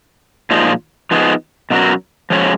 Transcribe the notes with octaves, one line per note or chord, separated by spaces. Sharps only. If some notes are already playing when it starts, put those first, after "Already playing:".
A#2 F3 G#3 D#4
F3 B3 D#4 G#4
B2 F#3 C#4 F#4 A#4
F3 G#3 C#4 F#4 C#5